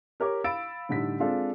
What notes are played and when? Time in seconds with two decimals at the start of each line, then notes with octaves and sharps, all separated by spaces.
0.20 G4 A#4 C#5 D6
0.44 F5 B5 E6 A6 D7
0.89 A2 D3 G3 D#4 B6
1.19 G#3 C4 D4 F4 A4